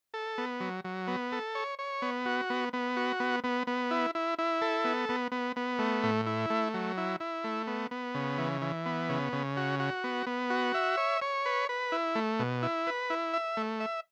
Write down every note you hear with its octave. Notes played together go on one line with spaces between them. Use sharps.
A4
B3
F#3
F#3
B3
A4
C#5
C#5
B3
F#4
B3
B3
F#4
B3
B3
B3
E4
E4
E4
A4
B3
B3
B3
B3
A3
A2
E4
A3
F#3
E4
E4
A3
B3
B3
C#3
E3
E3
B3
C#3
C#3
F#4
F#4
B3
B3
F#4
E5
C#5
C#5
B4
B4
E4
A3
B2
E4
B4
E4
E5
A3
E5